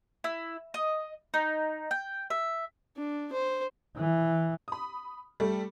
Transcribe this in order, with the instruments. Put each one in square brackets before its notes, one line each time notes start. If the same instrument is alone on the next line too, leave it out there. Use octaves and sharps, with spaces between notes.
[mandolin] E4
D#5
D#4
G5
E5
[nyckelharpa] D4
C5
[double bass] E3
[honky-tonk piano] B5 D#6
G3 A3 A4